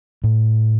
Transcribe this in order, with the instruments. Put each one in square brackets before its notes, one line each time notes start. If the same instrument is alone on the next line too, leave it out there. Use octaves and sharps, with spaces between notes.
[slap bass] A2